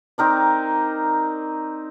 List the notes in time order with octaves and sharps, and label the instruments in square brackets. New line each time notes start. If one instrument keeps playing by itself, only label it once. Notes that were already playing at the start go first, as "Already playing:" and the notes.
[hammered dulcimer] C4 D#4 A#4 D5